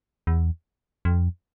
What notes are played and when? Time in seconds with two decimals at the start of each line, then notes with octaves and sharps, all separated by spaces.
0.27 E2
1.05 F2